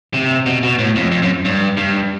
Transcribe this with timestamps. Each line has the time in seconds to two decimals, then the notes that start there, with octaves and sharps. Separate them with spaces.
0.14 C3
0.46 B2
0.63 B2
0.79 A2
0.96 F2
1.11 F2
1.22 F#2
1.45 G2
1.77 G2